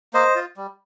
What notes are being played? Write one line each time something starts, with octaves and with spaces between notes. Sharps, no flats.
A#3 C5 D#5
F4
G3